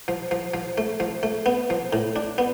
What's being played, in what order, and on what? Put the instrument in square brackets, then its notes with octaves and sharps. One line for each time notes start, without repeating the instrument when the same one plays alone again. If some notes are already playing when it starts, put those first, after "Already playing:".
[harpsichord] F3
F3
F3
A3
F3
A3
B3
F3
A2
D4
B3